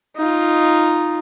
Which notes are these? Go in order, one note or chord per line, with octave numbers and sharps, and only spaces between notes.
D#4 F4